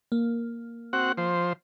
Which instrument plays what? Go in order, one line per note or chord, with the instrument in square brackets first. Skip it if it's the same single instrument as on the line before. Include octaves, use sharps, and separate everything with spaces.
[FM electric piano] A#3
[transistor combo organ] C4 F#4 F#5
F3 C5